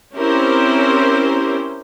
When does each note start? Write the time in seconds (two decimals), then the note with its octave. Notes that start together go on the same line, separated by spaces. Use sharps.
0.17 C4 C#4 E4 G4 A#4 C5